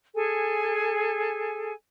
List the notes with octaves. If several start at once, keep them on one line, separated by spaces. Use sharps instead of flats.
G#4 A4 G#5